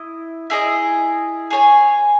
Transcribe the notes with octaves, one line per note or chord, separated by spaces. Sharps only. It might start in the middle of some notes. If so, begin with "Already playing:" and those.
Already playing: E4 D#5
E4 G#4 D#5
G#4 C#5 G#5